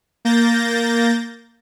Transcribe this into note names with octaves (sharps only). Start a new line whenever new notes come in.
A#3 G6 A6 A#6